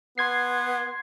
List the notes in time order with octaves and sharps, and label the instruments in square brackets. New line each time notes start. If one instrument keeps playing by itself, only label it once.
[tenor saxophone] B3 [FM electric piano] C6 G#6 C7